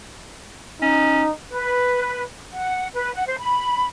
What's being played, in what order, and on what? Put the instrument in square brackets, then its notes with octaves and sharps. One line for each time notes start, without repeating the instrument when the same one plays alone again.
[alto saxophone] C#4 [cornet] D#4
[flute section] B4
F#5
B4
F#5
C5
B5